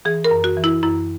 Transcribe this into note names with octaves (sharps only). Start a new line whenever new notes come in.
E3 G#4
A#4
F#2
F#4
E3
E4
F#2 E4